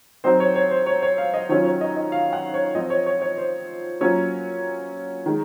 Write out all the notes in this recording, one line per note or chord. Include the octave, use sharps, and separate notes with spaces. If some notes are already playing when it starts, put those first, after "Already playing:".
F#3 C4 D#4 C5
C#5
C#5
C5
C#5
C#5
F5
D#5
D#3 F#3 C#4 F4 C#5
C#5
D#5
D#5
F5
F#5
C#5
F3 C4 F4 D#5
C#5
C#5
C#5
C5
F#3 A#3 C#4 F4 C#5
D#3 G#3